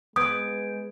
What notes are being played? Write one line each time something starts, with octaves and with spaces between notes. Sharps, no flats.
G#3 B3 D#6 G6 G#6 D7